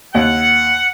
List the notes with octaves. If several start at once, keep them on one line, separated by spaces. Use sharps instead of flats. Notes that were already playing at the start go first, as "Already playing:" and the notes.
D#2 F#5